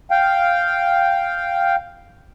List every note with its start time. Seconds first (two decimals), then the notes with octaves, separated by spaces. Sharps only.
0.11 F5 G5